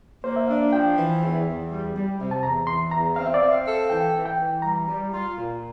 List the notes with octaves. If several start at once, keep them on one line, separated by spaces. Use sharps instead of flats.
A#3 C5
E5
D4 F5
F3 G5
E3
E2
E2
G3
G3
C3
A5
E2 A#5
E3 C6
E2 A#5
C4 F5
E5
D5
C4 E5
F5
A4
E3 G5
E3
G5
E3
G3 A#5
G3
F4
A#2